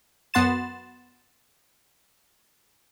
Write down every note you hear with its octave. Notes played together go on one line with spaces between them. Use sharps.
F#2 B3 F#5 C6 A6 E7